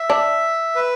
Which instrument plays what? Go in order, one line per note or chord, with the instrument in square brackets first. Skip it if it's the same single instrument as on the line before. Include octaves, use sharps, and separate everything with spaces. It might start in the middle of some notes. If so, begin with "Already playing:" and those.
Already playing: [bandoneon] E5
[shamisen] D4
[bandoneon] B4